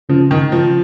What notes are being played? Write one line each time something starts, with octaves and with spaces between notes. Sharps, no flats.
C#3 F3
D#3
C#3
F3